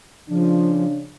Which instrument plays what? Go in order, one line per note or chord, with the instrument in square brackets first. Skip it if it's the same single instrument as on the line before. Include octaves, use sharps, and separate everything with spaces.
[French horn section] C#3 D4 [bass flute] F3